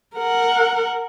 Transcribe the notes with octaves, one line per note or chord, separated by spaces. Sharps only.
A#4 F#5